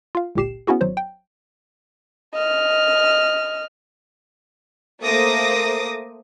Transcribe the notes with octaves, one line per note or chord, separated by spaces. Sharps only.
F4 F5
G1 C#2 A#2 G4 C7 E7
B3 C#4 E4 F#4 G#4
G#1 F#3 C5 C#5
G5
D#5 F6
A3 A#3 C5 D6 D#6 A#6